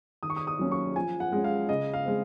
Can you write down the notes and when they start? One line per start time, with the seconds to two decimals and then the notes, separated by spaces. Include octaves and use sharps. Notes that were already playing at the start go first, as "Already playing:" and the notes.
0.23 D#3 D#6
0.30 C#6
0.36 D#6
0.47 D#6
0.59 F#3 A#3 C#4
0.72 C#6
0.96 F3 G#5
1.20 F#5
1.32 G#3 C#4
1.44 F5
1.69 C#3 D#5
1.94 F5
2.05 G#3 C4